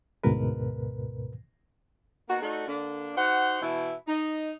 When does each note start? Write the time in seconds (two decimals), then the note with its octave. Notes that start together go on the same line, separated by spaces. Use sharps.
0.23 D2 G#2 B2 A#4 B4
2.29 A#3 B3 D#4 F#4
2.42 A3 D#4 F#4 A4 D5
2.68 D3 A#3 D4
3.16 D#4 F#4 C5 F#5
3.61 B2 E3 E4
4.07 D#4